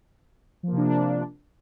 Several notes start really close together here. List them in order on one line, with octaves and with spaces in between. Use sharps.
F3 A#3 C3 D4